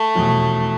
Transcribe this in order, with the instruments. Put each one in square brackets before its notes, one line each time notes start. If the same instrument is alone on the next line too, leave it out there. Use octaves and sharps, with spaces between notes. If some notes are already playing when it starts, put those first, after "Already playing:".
Already playing: [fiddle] A3
[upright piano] F1 E2 B2